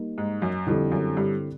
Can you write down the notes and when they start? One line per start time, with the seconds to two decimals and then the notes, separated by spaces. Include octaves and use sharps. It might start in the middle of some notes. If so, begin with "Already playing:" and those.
Already playing: G3 A#3 D#4
0.18 G#2
0.42 F#2
0.67 F2 D3 G3 C4 E4 A4
0.92 F#2
1.17 G2